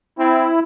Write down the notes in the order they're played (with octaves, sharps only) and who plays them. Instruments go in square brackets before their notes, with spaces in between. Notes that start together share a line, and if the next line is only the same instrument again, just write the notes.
[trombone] C4 [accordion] E4